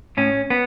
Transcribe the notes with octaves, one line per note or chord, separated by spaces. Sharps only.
A2 C#4
B3